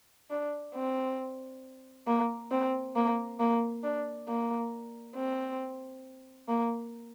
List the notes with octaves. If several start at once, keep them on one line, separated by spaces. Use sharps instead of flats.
D4
C4
A#3
C4
A#3
A#3
D4
A#3
C4
A#3